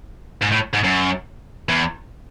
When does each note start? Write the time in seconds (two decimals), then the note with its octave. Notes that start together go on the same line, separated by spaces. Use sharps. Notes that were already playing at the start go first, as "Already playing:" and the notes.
0.42 G#2
0.52 A2
0.74 G#2
0.84 F#2
1.69 E2